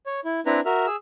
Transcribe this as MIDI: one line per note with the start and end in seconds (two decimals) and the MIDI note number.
0.06 0.20 73
0.25 0.40 64
0.46 0.60 60
0.46 0.60 62
0.46 0.60 64
0.46 0.60 71
0.46 0.60 82
0.65 0.86 66
0.65 0.86 70
0.65 0.86 76
0.65 0.86 89
0.86 0.96 68
0.86 0.96 88